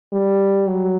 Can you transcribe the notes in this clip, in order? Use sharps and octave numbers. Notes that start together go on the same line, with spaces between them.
G3
F#3